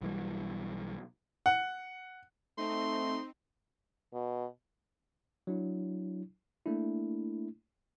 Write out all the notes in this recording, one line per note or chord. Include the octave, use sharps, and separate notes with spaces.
B1 E3 G3
F#5
A3 C4 D#4 C6
B2
F#3 D4 E4
A3 A#3 D4 E4